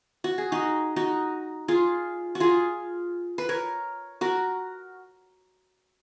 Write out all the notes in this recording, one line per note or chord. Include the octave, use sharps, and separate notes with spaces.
F#4
G#4
D#4 F#4
D#4 F#4
F4 G#4
F#4
F4 G#4
B4
A#4 C#5
F#4 A#4